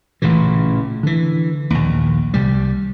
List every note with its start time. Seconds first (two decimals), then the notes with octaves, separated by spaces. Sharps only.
0.22 A1 A#2 C#3 E3
1.03 D3 E3
1.70 A#1 D#2
2.34 C2 G3